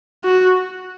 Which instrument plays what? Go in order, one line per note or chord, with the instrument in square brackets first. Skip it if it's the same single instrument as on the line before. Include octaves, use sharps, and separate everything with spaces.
[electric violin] F#4